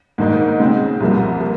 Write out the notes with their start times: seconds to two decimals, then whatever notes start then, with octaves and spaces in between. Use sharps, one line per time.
0.18 G#2 D#3 A#3 D#4
0.59 C#3 G#3 C4
1.00 C2 C3 F3 A#3
1.41 A#3